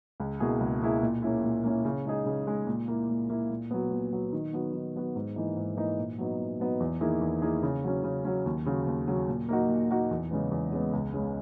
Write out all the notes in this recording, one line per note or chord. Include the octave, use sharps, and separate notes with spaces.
C#2
B2 A#3 E4 G#4
C#2
B2 A#3 E4 G#4
A#2
A#3 C#4 E4
A#2
A#3 C#4 E4
C#3
G#3 D#4 G#4
C#3
G#3 D#4 G#4
A#2
A#3 E4
A#2
A#3 E4
A#2
F#3 B3
A#2
F#3 B3
D#3
F#3 B3 F#4
D#3
F#3 B3 F#4
G#2
E3 A#3 D#4
G#2
E3 A#3 D#4
A#2
F#3 B3 D#4
A#2
F#3 B3 D#4
E2
D#3 A#3 E4 G#4
E2
D#3 A#3 E4 G#4
C#3
F#3 C#4
C#3
F#3 C#4
D#2
C#3 F#3
D#2
C#3 F#3
A#2
A#3 D#4 F#4
A#2
A#3 D#4 F#4
E2
C#3 G#3 B3
E2
C#3 G#3 B3
C#2
C#3 G#3